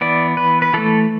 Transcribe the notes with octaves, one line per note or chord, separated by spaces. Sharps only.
E3 B3 D5
B4
B4
E3 A3 A4